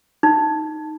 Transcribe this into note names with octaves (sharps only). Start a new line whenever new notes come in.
D#4